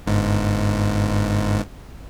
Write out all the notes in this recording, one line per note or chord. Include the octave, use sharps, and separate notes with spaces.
G1 G#2